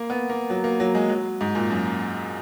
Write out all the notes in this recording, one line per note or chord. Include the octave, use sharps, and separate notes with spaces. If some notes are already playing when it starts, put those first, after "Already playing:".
Already playing: A#3
B3
A#3
F#3
A#3
F#3
G#3
F#3
G#2
A#2
F#2